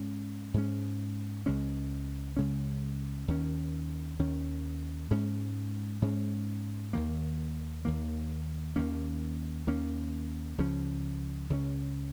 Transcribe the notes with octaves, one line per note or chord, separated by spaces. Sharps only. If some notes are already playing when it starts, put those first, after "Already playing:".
Already playing: G#2 G#3 C#4
G#2 G#3 C#4
C#2 C#3 G#3 C#4
C#2 C#3 G#3 C#4
D#2 D#3 C#4
D#2 D#3 C#4
G#2 G#3 C#4
G#2 G#3 C#4
D#2 D#3 A#3
D#2 D#3 A#3
D#2 D#3 A#3 C#4
D#2 D#3 A#3 C#4
C#2 C#3 F3 C#4
C#2 C#3 F3 C#4